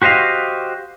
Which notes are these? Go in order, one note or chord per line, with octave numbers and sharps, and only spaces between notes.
F#4 G4 C5 D#5 F5